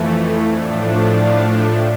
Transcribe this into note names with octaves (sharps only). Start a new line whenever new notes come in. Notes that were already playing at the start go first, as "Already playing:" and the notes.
Already playing: F2 E3 A3
A2 F3 A3 D4
F5 A5